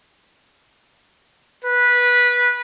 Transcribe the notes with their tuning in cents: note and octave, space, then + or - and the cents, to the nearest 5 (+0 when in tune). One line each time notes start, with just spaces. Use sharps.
B4 -15